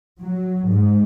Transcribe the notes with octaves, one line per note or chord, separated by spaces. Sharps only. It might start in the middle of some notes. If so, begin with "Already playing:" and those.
F#3
G#2